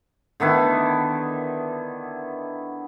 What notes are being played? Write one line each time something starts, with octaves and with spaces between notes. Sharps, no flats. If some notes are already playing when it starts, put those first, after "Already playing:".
D3 D#3 B3 E4